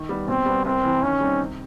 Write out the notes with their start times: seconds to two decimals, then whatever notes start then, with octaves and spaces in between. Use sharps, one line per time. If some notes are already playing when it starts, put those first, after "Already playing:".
Already playing: D#3
0.09 G3 B3
0.28 B2 C4
0.46 G3 B3
0.65 C2 C4
0.84 C3 E3
1.03 D#3 C#4
1.20 G3 C4 D#4
1.40 C3